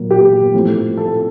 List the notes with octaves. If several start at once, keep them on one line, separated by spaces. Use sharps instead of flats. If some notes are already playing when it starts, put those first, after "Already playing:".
Already playing: A#2 F#3 A#3
G4
A2 F3 A3 C4
A4